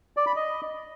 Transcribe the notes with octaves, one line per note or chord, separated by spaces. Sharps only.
D5
B5
D#5